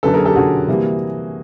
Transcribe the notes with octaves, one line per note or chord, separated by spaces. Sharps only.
F#2 D3 F#3 A4 B4
G#4 A#4
G4 A4
F#2 D3 F#3 F#4 G#4
C3 E3 G3 A#3